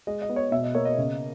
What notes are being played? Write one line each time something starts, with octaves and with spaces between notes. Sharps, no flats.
G#3 D#5
D#5
B3
C#5
B2 E5
D#5
A#3 C#5
D#5
C#3